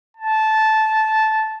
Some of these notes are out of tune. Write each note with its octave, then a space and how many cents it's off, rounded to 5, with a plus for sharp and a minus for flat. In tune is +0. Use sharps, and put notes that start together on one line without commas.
A5 -10